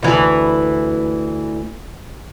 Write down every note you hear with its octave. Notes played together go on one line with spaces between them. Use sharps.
D2 E3